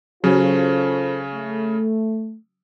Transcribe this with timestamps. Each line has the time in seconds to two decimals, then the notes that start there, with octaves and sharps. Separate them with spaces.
0.24 C#3 F#3 C#4 F4 A4 C5
1.34 A3